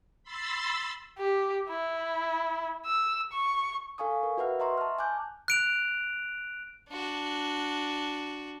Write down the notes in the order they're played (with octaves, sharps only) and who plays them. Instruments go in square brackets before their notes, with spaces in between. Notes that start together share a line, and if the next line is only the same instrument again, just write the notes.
[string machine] B5 C6 E6 A6
[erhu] G4
E4
E6
C#6
[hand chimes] A4 F5 G#5 C#6 D#6
A#4
F#4 B4 E5 F#5 F6
D#5 E5 A#5 C6 C#6
A5 F6
G#5 D6 F#6 G6
[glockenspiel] F#6 D7 F7
[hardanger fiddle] D4 F#4